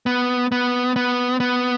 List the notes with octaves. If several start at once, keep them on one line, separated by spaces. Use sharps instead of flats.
B3
B3
B3
B3